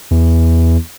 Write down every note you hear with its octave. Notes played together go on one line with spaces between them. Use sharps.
E2